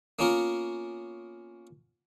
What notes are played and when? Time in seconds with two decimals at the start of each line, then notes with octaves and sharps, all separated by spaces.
0.19 A#3 B3 C#4 F4 A#4